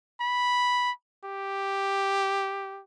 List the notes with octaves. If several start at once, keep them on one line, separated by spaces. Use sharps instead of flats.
B5
G4